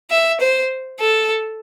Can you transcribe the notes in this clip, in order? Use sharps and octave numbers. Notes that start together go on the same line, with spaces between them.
E5
C5
A4